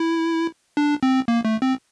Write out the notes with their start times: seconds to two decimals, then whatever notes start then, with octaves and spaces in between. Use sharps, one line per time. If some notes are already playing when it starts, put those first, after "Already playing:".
Already playing: E4
0.77 D4
1.03 C4
1.28 A#3
1.45 A3
1.62 C4